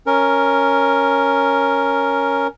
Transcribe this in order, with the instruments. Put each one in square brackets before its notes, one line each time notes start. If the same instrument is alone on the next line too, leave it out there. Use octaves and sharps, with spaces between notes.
[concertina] C#4 A#4